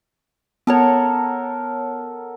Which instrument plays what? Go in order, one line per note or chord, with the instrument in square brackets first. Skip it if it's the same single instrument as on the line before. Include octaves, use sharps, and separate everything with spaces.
[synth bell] B3 C#5 [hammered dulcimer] A4 A#4 F#5